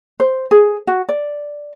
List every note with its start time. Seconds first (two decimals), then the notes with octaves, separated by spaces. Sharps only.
0.20 C5
0.51 G#4
0.87 F#4
1.09 D5